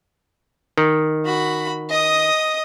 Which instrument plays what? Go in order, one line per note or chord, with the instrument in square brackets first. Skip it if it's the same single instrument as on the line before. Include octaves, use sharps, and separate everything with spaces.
[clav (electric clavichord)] D#3
[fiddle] F#4 B5
D#5 D#6